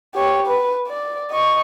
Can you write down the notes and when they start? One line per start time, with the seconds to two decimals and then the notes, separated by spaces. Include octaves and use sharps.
0.15 G4 C#5
0.46 B4
0.87 D5
1.31 D#5 C#6